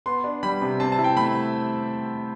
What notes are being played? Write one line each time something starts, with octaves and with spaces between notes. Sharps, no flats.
B3 C6
D4
G3 B5
C3
C4 A5
A5
E4
G5
A3 B5